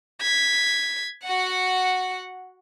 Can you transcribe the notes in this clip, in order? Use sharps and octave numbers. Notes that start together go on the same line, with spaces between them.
G#6 B6
F#4 F#5